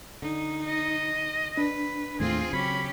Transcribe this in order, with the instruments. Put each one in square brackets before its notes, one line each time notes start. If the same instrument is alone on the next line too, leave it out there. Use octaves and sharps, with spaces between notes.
[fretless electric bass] D3 [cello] D#4
[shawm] D#5
[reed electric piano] D4 [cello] B4
[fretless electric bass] D#2 A2 A3 [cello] C4 F4 [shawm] G#4
[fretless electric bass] C#3 F#3 C4 [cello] C#4 G4 [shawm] B5